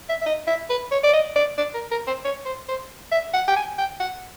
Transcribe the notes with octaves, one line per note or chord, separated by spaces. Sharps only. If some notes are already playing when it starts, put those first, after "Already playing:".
E5
E5
D#5
E5
B4
C#5
D5
D#5
D5
D5
A#4
A#4
C5
C#5
C5
C5
E5
F#5
G5
G#5
G5
F#5